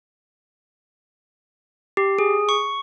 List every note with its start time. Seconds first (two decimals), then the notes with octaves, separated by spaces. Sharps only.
1.97 G4
2.19 G#4
2.49 C#6